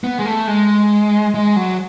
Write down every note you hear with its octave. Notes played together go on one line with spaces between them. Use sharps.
B3
G#3
A3
G#3
G#3
F#3